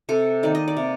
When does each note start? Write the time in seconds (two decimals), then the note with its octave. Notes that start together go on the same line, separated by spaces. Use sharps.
0.09 C3 A4
0.43 D#3 A#3 D5
0.55 D#5
0.68 D5
0.77 C3